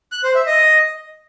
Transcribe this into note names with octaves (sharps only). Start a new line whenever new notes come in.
F#6
C5
E5
D#5